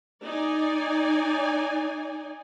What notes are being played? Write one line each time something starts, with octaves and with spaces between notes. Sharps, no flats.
D#4 D5 G#5